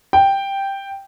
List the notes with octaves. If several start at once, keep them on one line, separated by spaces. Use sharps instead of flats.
G5